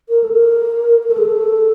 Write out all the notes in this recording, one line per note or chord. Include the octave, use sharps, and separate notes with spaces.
A#4
A4
A#4
A#4
A4
G#4
A4